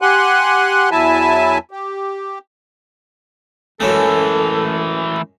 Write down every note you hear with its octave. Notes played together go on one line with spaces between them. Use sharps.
G4 F#5 G#5 C6 F#6
E2 F#3 E4 E5 G#5 A5
G4
F#2 C#3 E3 G#3 A3 A4